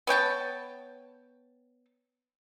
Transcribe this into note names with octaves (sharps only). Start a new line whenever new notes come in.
B3 C#5 G5 A5